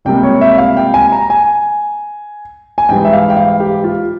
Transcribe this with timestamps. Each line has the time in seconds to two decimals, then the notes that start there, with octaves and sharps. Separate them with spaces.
0.05 C#2 C3 G3 A#3 G5
0.23 C#5
0.41 E5
0.58 F5
0.77 G5
0.94 G#5
1.12 A#5
1.30 G#5
2.78 G#5
2.89 G#2 E3 G3 G5
3.05 E5
3.13 F5
3.30 G5
3.37 F5
3.60 G4
3.84 F4